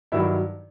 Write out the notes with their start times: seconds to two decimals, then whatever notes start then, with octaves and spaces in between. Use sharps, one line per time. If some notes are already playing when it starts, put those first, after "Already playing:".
0.12 G2 D#3 F#3 E4 E5